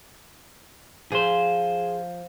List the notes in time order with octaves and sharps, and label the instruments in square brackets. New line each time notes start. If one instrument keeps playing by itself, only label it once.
[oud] F3 [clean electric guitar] G#4 C5